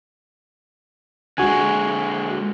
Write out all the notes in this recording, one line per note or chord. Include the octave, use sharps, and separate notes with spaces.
D3 G#3 F#4 G#5